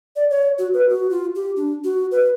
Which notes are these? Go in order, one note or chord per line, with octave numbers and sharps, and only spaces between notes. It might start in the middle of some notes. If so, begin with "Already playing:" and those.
D5
C#5
F#4
B4
F#4
F4
G4
D4
F#4
B4